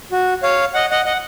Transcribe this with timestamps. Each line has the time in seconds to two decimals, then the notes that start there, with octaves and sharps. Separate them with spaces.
0.12 F#4
0.43 C#5 F5
0.74 D#5 F#5
0.91 D#5 F#5
1.06 D#5 F#5